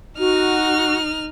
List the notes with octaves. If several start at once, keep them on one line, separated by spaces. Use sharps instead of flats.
D#4 F#4 F6